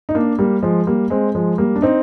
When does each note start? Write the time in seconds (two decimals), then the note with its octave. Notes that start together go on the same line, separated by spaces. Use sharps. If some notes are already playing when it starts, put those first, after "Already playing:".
0.09 D#4
0.15 A#3 D4
0.39 G3 A#3
0.62 F3 G#3
0.87 G3 A#3
1.10 G#3 C4
1.35 F3 G#3
1.58 G3 A#3
1.76 D4
1.82 C4 D#4